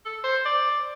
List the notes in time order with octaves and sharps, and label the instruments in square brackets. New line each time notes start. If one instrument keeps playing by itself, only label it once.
[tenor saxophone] A4
C5
D5